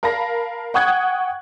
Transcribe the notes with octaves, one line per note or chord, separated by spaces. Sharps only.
A#4 F5 A5 B5 A#6
F#5 G5 C#6 D#6 F#6 G#6